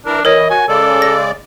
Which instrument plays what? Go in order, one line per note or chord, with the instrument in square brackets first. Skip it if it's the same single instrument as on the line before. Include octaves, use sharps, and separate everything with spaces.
[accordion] E3 A#4 [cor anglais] D4
[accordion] E3 [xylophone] A#4 C#5 [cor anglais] D#5
[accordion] F#4 [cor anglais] G#5
[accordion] C#3 G#3 D5 [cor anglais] A4
[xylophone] A#6